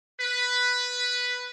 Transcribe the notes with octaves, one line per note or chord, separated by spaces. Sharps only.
B4